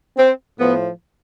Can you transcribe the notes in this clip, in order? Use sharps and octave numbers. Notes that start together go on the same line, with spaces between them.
C4
A2 F3 B3